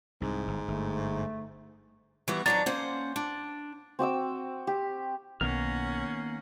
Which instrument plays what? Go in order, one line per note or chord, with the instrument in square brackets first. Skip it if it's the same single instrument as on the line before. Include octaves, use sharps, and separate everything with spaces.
[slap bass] C2 [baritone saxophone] G#2
[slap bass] G1
[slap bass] G1 [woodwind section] A3
[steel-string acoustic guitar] E3 G3 B3 [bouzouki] F#4
[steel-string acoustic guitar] F2 D#3 A#5 [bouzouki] F#3 D4 [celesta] A6
[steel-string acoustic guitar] A#3 C#4 F#5 [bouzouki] C5
[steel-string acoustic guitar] D4
[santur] C4 F#4 D6 E6
G4
[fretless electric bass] B1 [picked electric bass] D#3 B3 [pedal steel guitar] A#3 F6 [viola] C#4 F#5